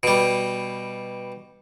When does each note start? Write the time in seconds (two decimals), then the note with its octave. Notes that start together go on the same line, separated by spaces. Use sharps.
0.03 B2 G3